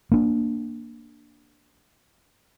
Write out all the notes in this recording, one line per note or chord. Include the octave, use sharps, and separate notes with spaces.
A#3 D4